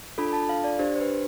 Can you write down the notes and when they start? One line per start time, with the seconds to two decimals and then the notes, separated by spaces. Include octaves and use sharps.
0.18 D4 F4 A4 B5
0.33 A5
0.49 F5
0.64 D5
0.79 D4 G4 C5
0.96 C5
1.00 B4